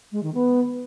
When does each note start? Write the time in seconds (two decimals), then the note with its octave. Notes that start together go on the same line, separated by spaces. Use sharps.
0.12 G#3
0.23 D#3
0.34 B3